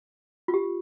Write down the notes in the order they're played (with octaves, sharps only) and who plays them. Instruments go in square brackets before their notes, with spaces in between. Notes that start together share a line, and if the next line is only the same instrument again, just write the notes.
[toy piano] F4
G4